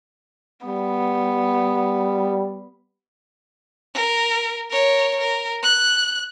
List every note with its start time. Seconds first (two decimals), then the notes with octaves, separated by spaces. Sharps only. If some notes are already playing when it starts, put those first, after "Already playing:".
0.66 G3 B3
3.94 A#4
4.70 A#4 C#5
5.20 A#4
5.63 F#6